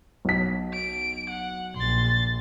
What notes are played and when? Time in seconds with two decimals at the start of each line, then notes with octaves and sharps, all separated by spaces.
0.25 B1 B6
0.73 D7
1.29 F#5
1.76 A#1 C6 A6